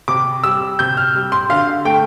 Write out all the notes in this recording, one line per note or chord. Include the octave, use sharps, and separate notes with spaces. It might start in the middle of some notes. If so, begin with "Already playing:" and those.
C3 D6
G3 E6
C3 G6
F6
G3
C6
D3 F5
A3 G5